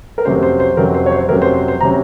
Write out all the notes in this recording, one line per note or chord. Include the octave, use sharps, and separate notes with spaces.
A#4
F2 C3 F#3 C#4 C5
C5
C5
F2 C3 F#3 C#4 A#4
C5
C#5
C5
F2 C3 F#3 C#4 A#4
C5
C5
C5
C3 F#3 C#4 A#5